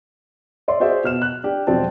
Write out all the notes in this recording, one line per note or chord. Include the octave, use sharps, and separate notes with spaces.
C#5 D5 E5 C6
F#4 G#4 C5 D5 E5
B2 F6 E7
F#6
D4 G4
E1 F3 F#3 C4 D5 A5